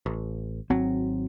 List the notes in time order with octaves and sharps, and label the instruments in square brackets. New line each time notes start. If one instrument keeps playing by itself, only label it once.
[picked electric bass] A1
[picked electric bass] G#1 F#3 [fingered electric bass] C4